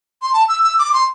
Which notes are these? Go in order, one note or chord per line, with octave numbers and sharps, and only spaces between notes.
C6
A5
E6
E6
D6
C6